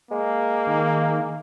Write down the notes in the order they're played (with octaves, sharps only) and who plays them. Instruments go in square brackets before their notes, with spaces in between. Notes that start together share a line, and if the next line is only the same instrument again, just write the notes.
[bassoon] G#3 [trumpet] A#3
[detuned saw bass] D#3